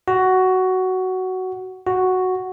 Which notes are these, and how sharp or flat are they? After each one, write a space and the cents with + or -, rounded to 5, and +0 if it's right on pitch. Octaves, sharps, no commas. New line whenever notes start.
F#4 +10
F#4 +0